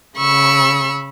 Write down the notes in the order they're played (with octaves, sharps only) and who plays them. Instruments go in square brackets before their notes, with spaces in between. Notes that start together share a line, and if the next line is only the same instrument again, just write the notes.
[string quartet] C#3 B5 C#6 E6